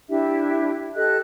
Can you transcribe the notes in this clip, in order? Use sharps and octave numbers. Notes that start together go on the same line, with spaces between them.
D4 E4 G4 E5
G4 A4 D#5 F#6